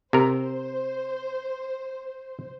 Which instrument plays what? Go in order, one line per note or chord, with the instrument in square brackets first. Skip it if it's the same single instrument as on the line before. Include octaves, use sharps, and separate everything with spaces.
[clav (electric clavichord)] C3 A#4 [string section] C5